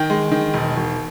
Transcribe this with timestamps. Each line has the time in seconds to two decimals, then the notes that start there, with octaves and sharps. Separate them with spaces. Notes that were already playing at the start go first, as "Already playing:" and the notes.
Already playing: D#3 G5
0.10 G#3
0.32 D#3
0.54 E1
0.76 E1